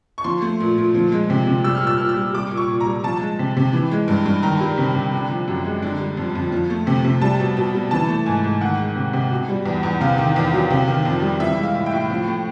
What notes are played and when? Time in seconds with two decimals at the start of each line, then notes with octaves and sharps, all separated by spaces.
0.18 C#6
0.24 F3 C6
0.42 A3
0.60 A#2
0.78 A#2
0.94 F3
1.12 G#3
1.30 C3
1.47 C3
1.64 G3 E6
1.75 F6
1.81 A#2
1.87 E6
1.98 A#2 F6
2.09 E6
2.16 G3
2.33 G3 D6
2.51 A#2
2.57 C#6
2.68 A#2
2.81 A#5
2.86 G3
3.03 F3 A5
3.21 G#3
3.39 C3
3.57 C3
3.73 E3
3.91 G#3
4.08 G2
4.26 G2
4.43 D#3 A#5
4.61 G3
4.78 C3
4.95 C3
5.13 D3
5.30 F3
5.48 F#2
5.65 G#3
5.82 D3
6.00 G3
6.17 F2
6.35 F2
6.52 F3
6.70 A3
6.87 C3
7.05 C3
7.21 G3 A5
7.40 B2
7.57 B2
7.74 G3
7.91 E3 A5
8.08 A3
8.26 G#2 G#5
8.44 G#2
8.61 D#3 F#5
8.79 G#3
8.96 C3
9.13 C3
9.31 B2
9.49 G3
9.66 E2
9.83 E2
10.01 C3 F5
10.18 D#3
10.36 E2
10.53 F#3
10.70 C3
10.88 D#3
11.05 F2
11.22 G3
11.40 E3 E5
11.57 G#3
11.63 F5
11.74 A2
11.86 G5
11.92 A2
12.10 F3
12.28 A3